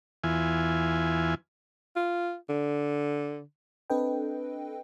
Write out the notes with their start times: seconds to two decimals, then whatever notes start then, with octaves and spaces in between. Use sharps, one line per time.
0.24 E2 E3 F4 G#5
1.96 F4
2.49 D3
3.90 C4 D4 A4 B4 D#5 G5